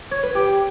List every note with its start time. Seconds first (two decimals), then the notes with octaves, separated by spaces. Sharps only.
0.12 C#5
0.23 B4
0.35 G4